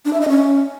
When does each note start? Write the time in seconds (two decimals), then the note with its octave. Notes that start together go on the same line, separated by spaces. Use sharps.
0.05 D4
0.13 E5
0.21 D#5
0.29 C#4